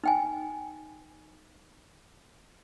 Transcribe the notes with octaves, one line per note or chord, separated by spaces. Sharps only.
D#4 G5 G#5